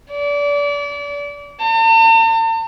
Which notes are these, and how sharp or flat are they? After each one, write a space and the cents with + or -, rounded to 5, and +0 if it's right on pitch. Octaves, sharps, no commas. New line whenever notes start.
D5 -30
A5 +45